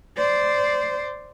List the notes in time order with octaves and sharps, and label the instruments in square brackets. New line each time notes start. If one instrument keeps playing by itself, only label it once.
[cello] C5 D5